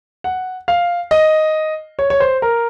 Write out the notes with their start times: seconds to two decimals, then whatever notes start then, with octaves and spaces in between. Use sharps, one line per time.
0.24 F#5
0.68 F5
1.11 D#5
1.99 C#5
2.10 C#5
2.20 C5
2.42 A#4